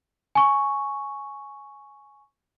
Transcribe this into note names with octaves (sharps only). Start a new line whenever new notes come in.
G#5 C#6